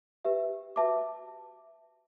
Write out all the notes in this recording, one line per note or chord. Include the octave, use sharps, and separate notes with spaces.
G4 B4 E5
F#4 B4 E5 A5 D6